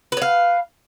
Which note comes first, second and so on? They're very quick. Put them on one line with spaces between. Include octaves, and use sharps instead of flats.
B4 C#5 F5